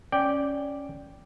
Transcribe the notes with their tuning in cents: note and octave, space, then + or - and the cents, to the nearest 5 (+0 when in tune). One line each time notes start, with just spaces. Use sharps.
C#4 +0 D5 +0 G5 +0